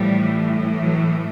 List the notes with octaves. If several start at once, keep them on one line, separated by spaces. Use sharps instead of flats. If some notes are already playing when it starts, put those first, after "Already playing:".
Already playing: A2 E3 F3 G3
F#3